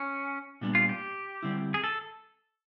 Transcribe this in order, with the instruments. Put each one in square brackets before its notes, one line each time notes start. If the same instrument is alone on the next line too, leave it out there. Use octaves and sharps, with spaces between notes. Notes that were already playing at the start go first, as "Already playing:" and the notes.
Already playing: [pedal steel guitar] C#4
[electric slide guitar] A#2 G3 B3 D4
[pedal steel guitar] F4
G4
[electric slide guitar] D3 G3 C4 E4
[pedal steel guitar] G#4
A4